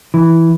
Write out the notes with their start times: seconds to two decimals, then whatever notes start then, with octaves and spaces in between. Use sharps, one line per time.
0.14 E3